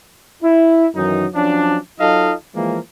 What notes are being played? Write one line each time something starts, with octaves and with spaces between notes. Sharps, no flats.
E4
F#2 D#3 E3 F#3 D#4
F3 F#3 C#4 D4
F#3 D#4 F4 A4 D#5 F5
E3 F3 G#3 A#3